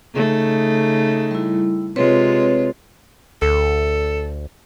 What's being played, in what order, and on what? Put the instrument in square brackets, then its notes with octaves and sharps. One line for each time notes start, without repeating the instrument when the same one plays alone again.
[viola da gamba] C#3 A3 D#4
[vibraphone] G3 E4
[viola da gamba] C3 G#3 F4 [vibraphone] C4 B4 C#5
[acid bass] D2 [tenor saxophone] A4